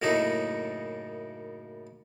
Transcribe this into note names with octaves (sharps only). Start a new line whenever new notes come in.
F#2 A2 C#3 A#3 D#4 E4